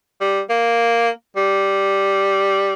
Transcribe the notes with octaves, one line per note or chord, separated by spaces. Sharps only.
G3
A#3
G3